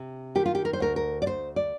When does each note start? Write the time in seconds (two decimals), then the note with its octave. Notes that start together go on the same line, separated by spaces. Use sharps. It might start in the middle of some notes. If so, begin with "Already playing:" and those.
Already playing: C3
0.35 D#3 G4
0.46 F4
0.55 G4
0.65 A#4
0.73 C5
0.80 D2 A#4
0.96 A#4
1.22 D5
1.26 D2 C5
1.56 D5